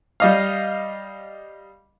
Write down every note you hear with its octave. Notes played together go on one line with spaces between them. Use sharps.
G3 D#5 F5